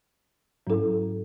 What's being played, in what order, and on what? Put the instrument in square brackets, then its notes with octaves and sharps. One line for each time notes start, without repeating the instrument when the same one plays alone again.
[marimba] G#2 F#3 C#4 E4 A4